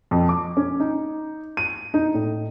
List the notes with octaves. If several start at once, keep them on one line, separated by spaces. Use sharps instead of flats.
F2
D6
C#4
D#4
D#7
D#4
A2